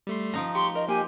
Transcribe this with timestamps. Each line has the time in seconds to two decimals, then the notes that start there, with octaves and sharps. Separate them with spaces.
0.07 G3 A3 C6
0.33 F3 D#4 A#5
0.55 G4 C6 C#6
0.75 A#4 D#5
0.88 A#3 G4 G#5